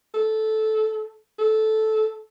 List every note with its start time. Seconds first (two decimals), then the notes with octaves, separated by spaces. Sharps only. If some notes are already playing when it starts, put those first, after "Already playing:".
0.14 A4
1.39 A4